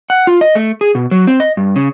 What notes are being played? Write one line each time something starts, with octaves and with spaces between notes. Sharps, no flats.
F#5
F4
D#5
A3
G#4
B2
F#3
C4
D#5
G2
C#3